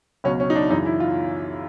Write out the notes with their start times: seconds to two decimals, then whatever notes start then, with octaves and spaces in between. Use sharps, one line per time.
0.24 C#2 B2 F#3 C#4
0.40 C#4
0.50 D#4
0.55 D4
0.70 F#2 C#3 E3 D#4
0.86 E4
1.00 F4